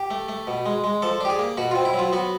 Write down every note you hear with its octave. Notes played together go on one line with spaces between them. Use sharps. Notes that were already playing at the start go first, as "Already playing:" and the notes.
Already playing: G4
A3
A3
B2
G#3
G#3
F3 A4
D4 G4
G#4
A#3
B2 F#4
C4 F4
E4
F#3
F4
B3 F#4